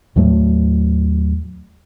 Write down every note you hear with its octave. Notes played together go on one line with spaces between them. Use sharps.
D#2 A2 F#3 A3